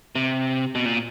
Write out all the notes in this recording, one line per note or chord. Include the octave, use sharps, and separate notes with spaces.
C3
B2
A#2